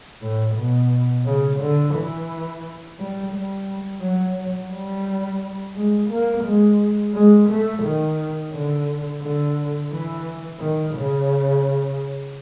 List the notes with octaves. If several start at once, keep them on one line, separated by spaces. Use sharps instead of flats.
A2
B2
C#3
D3
E3
G3
G3
F#3
G3
G#3
A#3
G#3
G#3
A3
D#3
D3
D3
E3
D#3
C#3